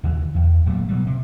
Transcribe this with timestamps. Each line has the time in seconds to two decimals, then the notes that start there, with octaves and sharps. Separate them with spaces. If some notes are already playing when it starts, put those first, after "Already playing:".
0.03 D#2 D3 E3
0.34 E2
0.66 D1 A#2 F#3 A3
0.89 B2 F#3 G3
1.06 C3